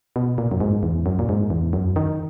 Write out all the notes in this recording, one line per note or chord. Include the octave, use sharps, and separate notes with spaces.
B2
A#2
F#2
G#2
E2
F#2
A#2
G#2
E2
F#2
D#3